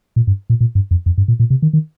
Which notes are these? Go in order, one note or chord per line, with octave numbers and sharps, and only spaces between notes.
A#2
G2
A#2
A#2
G2
F2
F2
G2
A#2
A#2
C3
D#3
D#3